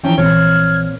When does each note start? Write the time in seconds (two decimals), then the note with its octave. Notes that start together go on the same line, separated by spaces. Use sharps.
0.04 E3 F3 C#4 G5 A5 A#5
0.18 A#1 A#2 E3 C4 C#5 F6 G#6